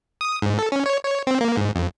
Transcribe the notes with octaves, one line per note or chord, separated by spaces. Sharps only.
D#6
G#2
A4
C#4
C#5
C#5
C4
A#3
G#2
F2